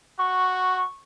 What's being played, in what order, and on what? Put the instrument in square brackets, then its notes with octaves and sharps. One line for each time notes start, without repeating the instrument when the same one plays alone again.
[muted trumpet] F#4 [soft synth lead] C#6